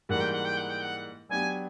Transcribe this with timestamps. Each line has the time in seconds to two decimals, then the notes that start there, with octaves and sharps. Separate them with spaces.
0.09 G#2 E3 G3 A#3 F#5
0.20 G5
0.33 F#5
0.45 G5
0.57 F#5
0.70 G5
0.81 F#5
1.29 F#3 B3 D4 G4 G#5